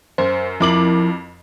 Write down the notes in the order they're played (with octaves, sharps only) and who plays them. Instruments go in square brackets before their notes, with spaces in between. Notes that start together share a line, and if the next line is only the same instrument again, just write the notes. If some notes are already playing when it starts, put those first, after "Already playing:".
[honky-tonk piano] F#2 [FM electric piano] C5
[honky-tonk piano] F2 D6 F#7 [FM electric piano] F3 E4 A#4